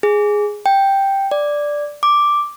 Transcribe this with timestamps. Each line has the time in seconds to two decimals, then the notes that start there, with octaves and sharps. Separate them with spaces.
0.03 G#4
0.66 G5
1.31 D5
2.03 D6